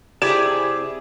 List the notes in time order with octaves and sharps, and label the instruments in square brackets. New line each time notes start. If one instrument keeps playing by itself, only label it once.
[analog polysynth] C3 E4 G#4 [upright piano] G4 G#6 E7 [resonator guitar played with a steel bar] D5